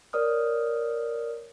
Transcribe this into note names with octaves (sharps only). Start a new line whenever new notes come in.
A#4 C#5 D5 D#6 F6